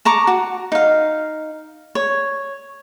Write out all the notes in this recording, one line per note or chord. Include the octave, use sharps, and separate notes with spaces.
A5 A#5 C#6 D6
F#4
D#4 F5
C#5